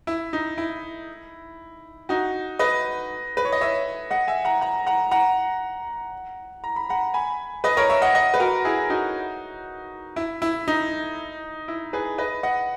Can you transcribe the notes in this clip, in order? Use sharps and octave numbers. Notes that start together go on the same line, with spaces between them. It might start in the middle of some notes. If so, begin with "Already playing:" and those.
E4
D#4
E4
D#4 F#4
B4 D#5
B4
C#5
D#5
C#5 E5
D#5 F#5
E5 G#5
F#5 A#5
F#5 A#5
F#5 A#5
F#5 A#5
A#5
B5
F#5 A#5
G#5 B5
B4 D#5
A#4 C#5
C#5 E5
D#5 F#5
D#5 F#5
B4
F#4 A#4
E4 G#4
D#4 F#4
E4
E4
D#4
E4
G#4 B4
B4 D#5
D#5 F#5